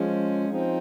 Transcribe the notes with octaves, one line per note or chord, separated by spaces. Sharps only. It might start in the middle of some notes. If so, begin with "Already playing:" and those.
Already playing: F3 G#3 C#4
F3 C4 D#4